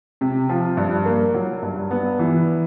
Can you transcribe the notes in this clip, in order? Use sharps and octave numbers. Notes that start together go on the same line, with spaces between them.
C3
F3
G2
A#3
F#3
G2
B3
E3